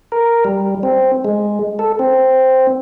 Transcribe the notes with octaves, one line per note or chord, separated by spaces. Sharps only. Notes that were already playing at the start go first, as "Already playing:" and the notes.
A#4
G3
C4
G#3
A4
C4